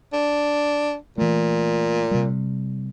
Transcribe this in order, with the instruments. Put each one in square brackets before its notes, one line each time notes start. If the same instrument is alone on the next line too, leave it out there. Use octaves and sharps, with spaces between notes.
[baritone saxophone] D4
[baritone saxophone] A#2 [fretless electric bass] E3 A3
[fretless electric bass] C3 G3